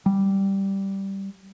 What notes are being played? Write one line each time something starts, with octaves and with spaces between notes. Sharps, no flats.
G3